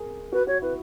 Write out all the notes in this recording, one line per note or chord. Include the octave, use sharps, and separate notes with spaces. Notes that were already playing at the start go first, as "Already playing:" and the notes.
Already playing: G#4 A#4
F#4 B4
F#4 C#5
E4 B4